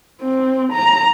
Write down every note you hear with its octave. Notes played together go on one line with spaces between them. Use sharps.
C4
A#5